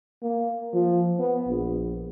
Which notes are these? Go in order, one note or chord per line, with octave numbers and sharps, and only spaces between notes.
A#3
F3
B3
A#1